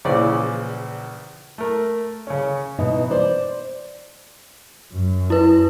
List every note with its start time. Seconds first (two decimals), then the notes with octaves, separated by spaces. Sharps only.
0.05 A#1 C#3 E3 C5 D5
1.58 A3 A#4
2.27 C#3 C#4
2.79 B2 E3 D#4
3.11 C5 D5
4.92 F#2
5.30 E4 B4